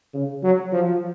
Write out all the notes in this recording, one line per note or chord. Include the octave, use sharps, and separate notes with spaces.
C#3
F#3
F3